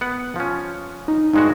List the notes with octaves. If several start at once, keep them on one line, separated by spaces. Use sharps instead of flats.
B3 F#5
F3 C#4
D#4
G2 G#3 D#4 F#4